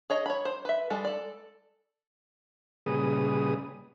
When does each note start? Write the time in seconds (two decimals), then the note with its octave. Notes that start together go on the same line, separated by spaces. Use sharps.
0.10 G#4 C#5 D#5
0.26 C#5 B5
0.45 C5
0.65 B4 E5
0.90 G3 G#3 A4
1.05 A4 D5
2.86 A#2 C#3 G3 G#4 B4 D#6